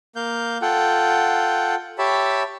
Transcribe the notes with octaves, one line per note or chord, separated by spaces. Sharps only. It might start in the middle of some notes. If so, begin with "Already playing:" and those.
A#3 F5 G6
F4 A4 F#5 G5
G4 C#5 E5 A5 B5